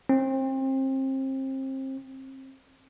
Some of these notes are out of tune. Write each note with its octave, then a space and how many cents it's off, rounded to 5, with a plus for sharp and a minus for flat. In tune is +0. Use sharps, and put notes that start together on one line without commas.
C4 +30